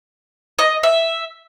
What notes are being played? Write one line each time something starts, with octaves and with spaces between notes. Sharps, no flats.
D#5
E5